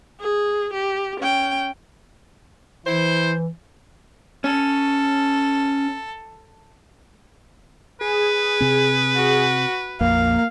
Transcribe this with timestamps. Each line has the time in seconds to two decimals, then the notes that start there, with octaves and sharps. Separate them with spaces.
0.21 G#4
0.73 G4
1.20 C#4 G5
2.86 E3 E4 C5
4.44 C#4 A4
8.01 G#4 B4
8.61 C3 C4
9.15 F#4
10.01 A#1 F2 A#3 F5